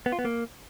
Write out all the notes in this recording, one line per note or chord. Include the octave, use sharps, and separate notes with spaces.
B3
F4
B3
A#3